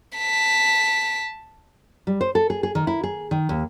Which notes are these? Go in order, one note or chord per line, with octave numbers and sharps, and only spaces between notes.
A5 B6
G3
C5
A4
G#4
G#4
D#3
E4
G#4
D#3
D#2